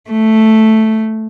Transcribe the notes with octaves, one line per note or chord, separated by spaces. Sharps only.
A3